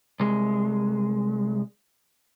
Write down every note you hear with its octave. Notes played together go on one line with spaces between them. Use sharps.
C2 G#3